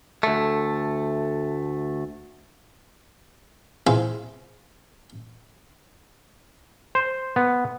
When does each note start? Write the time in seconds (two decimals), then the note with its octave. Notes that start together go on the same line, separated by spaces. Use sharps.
0.23 D2 A3
3.87 C4 E4 F4 G#4 B4 C5
6.95 C5
7.36 B3